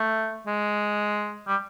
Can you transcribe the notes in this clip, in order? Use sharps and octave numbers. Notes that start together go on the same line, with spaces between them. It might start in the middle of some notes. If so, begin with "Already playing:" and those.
Already playing: A3
G#3
G3